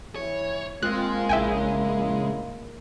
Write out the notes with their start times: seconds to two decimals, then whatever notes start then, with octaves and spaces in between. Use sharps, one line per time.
0.15 E3 C#5
0.83 G#3 A#3 C4 F4 F#6
1.29 A#1 C#3 E4 E5 G5 G#5